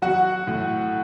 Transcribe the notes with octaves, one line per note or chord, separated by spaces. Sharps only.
F#3 F#4 F#5
A2